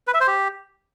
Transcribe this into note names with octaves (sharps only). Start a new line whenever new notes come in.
B4
E5
C5
G4